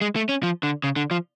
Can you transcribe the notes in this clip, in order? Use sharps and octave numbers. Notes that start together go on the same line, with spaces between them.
G#3
A3
C#4
F3
D3
C#3
D3
F3